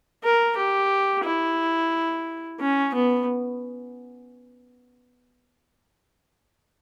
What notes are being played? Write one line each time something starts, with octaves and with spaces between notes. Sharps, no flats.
A#4
G4
E4
C#4
B3